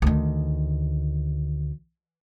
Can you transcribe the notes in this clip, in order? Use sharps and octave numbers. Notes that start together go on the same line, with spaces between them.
D2 D#3